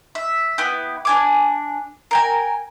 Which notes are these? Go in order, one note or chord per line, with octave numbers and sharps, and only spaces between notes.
E5
B3 E4 G4
D4 G#5 D6
A#4 G5 G#5